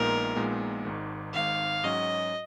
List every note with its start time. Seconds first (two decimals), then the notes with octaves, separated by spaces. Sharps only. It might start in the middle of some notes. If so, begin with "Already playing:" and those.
Already playing: A#1 A#2 G#3 B3 D#4 A#4
0.35 A#1 A#2 G#3 B3 D#4
0.85 G#1 G#2 D#3
1.34 G#1 G#2 D#3 F5
1.84 G#2 F#3 C#4 F#4 D#5